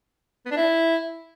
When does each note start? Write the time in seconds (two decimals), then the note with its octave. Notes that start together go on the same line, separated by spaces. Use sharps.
0.46 B3
0.51 D4
0.57 E4